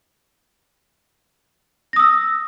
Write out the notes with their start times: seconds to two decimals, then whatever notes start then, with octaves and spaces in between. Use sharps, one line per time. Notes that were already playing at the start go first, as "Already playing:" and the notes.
1.93 A#6
1.96 D#6
1.99 E6